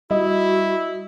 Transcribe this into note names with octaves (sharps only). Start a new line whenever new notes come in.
G3 E4 F#4 D#5